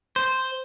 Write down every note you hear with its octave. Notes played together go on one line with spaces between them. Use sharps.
C5